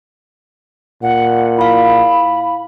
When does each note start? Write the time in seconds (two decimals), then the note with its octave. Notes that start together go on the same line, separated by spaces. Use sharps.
1.02 A#2 F#5
1.58 E4 F5 B5